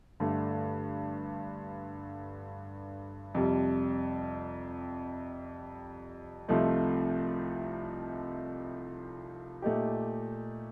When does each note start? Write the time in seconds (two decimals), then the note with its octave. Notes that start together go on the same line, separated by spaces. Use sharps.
0.20 G2 D3 A3
3.35 F2 C3 G3
6.48 C2 C3 F3 A3 D#4
9.62 A#2 A3 D#4 G4